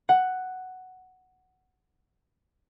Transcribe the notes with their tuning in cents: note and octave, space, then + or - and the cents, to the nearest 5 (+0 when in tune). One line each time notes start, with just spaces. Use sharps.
F#5 +5